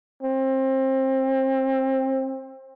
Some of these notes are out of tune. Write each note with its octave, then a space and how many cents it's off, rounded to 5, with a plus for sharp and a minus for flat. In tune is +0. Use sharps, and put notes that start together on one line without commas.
C4 +25